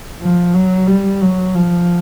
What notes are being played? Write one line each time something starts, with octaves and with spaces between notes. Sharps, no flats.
F3
F#3
G3
F#3
F3